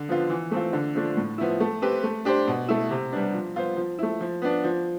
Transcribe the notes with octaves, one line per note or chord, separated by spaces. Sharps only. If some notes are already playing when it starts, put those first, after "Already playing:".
Already playing: D3
F3 B3 F4
E3
A3 C4 F4
D3
F3 A3 D4
A2
F3 B3 E4
A3
C4 G4 B4
A3
D4 G4 C5
B2
A3 E4
C3
G3 B3 D4
F3
B3 F4 C5
F3
A3 E4
F3
B3 D4
F3